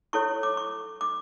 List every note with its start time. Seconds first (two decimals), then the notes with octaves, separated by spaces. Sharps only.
0.13 E4 A4 C#5 C#6
0.43 D6
0.57 C#6
1.01 D6